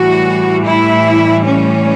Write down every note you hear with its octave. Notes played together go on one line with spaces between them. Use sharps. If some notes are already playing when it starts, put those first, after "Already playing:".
Already playing: A2 E3 G3 F#4
E4
C#4